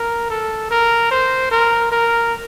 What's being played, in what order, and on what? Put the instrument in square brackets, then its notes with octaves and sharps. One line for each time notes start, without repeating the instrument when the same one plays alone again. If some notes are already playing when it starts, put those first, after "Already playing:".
Already playing: [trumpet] A#4
A4
A#4
C5
A#4
A#4